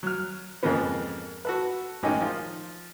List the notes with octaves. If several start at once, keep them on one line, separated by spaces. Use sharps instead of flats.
F#3 F6
F2 G#2 C#3 F3 A#3 B3
F#4 A4 B4
A1 D#3 G#3 C#4 D#4 G5
F3 F4